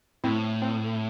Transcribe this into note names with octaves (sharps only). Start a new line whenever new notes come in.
A2 C4 E4
C4